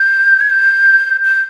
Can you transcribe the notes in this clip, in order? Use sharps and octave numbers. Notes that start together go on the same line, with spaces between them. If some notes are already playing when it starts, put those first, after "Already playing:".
Already playing: G6
G#6
G6
G6